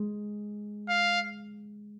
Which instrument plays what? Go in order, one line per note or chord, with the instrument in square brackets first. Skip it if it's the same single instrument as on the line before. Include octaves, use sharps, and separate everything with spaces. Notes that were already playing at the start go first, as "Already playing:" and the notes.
Already playing: [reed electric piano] G#3
[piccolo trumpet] F5